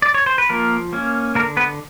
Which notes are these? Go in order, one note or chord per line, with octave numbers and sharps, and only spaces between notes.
D5
C#5
C5
B4
F3 A#3 A#4
A#3 C#4
D3 A#3 A#4
B3 B4